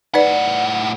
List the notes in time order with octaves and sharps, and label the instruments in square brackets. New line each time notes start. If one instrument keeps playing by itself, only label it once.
[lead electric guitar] A2 F#5 [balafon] D#4 B4 D5